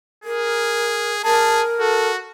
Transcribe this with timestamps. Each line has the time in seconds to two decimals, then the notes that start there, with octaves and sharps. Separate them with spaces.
0.24 G#4 A#4
1.24 G#4 A#4 A5
1.80 F#4 A4